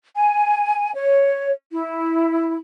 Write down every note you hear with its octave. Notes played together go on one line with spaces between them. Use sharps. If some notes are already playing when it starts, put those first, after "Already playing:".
G#5
C#5
E4